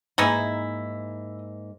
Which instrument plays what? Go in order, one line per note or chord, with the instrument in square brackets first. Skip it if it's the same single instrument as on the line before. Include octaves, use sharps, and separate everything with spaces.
[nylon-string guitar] G#2 A#3 E5 [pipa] E3 D#4 E4